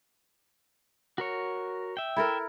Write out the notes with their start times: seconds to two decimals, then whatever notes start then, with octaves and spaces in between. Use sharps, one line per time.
1.18 F#4 A#4 C#5
1.97 E5 G5
2.16 E4 A4 A#4